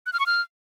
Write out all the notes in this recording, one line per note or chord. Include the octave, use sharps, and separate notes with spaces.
F#6
F6
C#6
F6